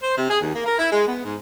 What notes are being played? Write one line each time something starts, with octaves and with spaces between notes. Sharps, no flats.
C5
C3
G#4
D#2
A#3
A#4
E4
G#3
B3
G#2